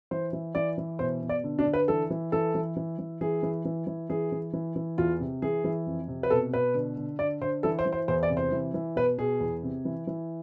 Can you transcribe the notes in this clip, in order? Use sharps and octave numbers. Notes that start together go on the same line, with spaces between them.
E3 C5
E3
E3 D5
E3
B2 C5
B2
D5
D3
D4
D3
B4
E3 A4
E3
E3 A4
E3
E3
E3
E3 G#4
E3
E3
E3
E3 G#4
E3
E3
E3
E2 F4
C3
E3 G#4
E3
F2
C3
B4
B2 A4
B2 B4
D3
D3
D3 D5
D3 C5
E3 A4
C5
E3
C5
E2 C5
D5
C3
C5
E3
E3
B2 B4
B2 G#4
E2
C3
E3
E3